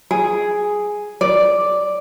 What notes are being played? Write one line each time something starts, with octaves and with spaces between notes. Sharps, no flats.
G#4
D5